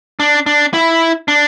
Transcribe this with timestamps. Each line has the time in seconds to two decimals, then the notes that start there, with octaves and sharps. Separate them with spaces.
0.20 D4
0.46 D4
0.73 E4
1.28 D4